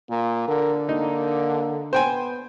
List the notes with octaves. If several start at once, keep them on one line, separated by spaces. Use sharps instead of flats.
A#2 A#3
D3 A#4
A#3 D#4
B3 C5 G5 G#5